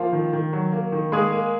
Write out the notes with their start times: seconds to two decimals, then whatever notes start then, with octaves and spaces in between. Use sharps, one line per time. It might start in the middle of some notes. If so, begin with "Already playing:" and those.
Already playing: F3 A#3 F4
0.12 D#3
0.33 D#3
0.53 F#3
0.72 A#3
0.92 D#3
1.12 G#3 A#3 G#4
1.32 A#3